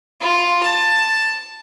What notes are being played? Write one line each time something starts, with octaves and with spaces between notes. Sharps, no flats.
F4
A5